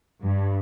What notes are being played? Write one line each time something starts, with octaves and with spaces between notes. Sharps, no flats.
G2